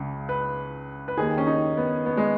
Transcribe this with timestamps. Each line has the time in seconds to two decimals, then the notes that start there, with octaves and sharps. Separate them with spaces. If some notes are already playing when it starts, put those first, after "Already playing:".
Already playing: C#2 C#3
0.29 B4
1.08 B4
1.17 D#2 D#3 G#4
1.38 C#4
1.47 D#4
1.77 B3
2.06 B3
2.17 G#3